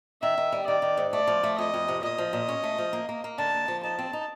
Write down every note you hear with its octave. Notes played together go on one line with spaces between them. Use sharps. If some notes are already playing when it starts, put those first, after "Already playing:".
D#3 E5
D#3
G3
D#3 D5
D#3
G#2
A3 D5
F3
A3
F2 D#5
F2
C3
A#2 D#5
F3
A#2
C#4
A3
F3
A#3
A#3
A#3
D3 A5
A#3
F3
D#4 A5
C4
D#4